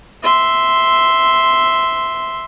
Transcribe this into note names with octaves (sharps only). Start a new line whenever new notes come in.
E5 C6